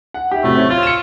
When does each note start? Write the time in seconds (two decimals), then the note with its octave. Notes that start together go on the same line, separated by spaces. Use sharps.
0.14 F#5
0.31 E4 G4
0.44 A2 C3 F#3 A3
0.57 C4 C#5
0.70 F4 A6
0.83 C#7 E7